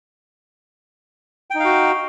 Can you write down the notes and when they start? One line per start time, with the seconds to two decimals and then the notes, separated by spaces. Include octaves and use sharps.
1.50 G5
1.55 D#4
1.60 F5
1.64 F#4